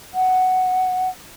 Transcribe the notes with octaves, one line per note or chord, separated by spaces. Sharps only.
F#5